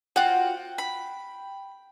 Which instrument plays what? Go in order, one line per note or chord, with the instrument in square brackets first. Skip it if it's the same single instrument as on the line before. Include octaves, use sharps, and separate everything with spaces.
[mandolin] F4 F#4 F#5 [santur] G5
[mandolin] B5